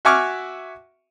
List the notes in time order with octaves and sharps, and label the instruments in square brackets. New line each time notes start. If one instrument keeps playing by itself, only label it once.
[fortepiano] F#4 E5 G#5 C#6 D6 F6